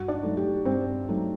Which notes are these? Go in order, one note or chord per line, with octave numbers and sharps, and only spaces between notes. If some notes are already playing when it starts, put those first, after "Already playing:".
Already playing: G2 F#4 F#5
D4 D5
F#3 A3 D#4
G4
G2 C4 C5
F#3 A3 D#4